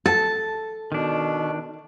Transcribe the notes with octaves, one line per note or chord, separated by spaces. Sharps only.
A4 A5
B2 D#3 D4